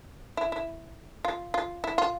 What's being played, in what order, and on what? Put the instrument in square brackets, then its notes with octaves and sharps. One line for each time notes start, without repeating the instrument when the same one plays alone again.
[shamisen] E4
E4
F4
F4
E4
F4